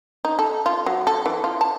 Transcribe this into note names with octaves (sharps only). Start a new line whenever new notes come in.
D#4
A4
F4
F#3
A4
E3
F4
A5